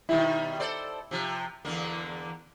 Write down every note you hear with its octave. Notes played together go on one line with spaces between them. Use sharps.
B2 D#3 G3 E4
A4 C5 D5
C3 F3
E2 D3 A#3